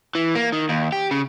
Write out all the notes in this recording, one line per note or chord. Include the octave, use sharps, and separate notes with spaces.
E3
A#3
D#3
D#2
G4
C#3